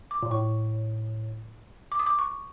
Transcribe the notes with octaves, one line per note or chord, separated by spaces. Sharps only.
D6
A#2
A2 C#6
D6
D#6
D6
C#6